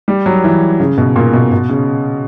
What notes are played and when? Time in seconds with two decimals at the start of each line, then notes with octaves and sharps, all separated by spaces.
0.08 G3
0.26 F#3
0.44 E3
0.80 C#3
0.98 B2
1.16 A#2
1.33 B2
1.52 B2
1.69 C#3